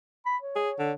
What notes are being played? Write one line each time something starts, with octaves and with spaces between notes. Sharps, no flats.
B5
C#5
G#4
D3